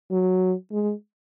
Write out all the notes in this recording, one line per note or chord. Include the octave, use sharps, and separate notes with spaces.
F#3
G#3